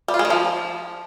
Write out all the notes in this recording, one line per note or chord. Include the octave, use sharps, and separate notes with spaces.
G3
F4
G#3
D#3
F3